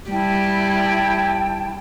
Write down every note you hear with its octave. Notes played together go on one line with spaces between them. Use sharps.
G3 E4 G5 A5